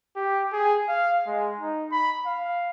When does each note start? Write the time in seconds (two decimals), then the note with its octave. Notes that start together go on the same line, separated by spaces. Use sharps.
0.16 G4
0.52 G#4
0.88 F5
1.27 G#3
1.59 D#4
1.92 B5
2.26 F5